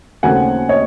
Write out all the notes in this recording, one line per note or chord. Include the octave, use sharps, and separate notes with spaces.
D#2 C#3 F#3 A3 C4 F#5 G#5
C#5 D#5